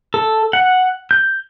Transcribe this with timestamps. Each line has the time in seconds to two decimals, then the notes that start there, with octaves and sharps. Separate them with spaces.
0.14 A4
0.53 F#5
1.11 G6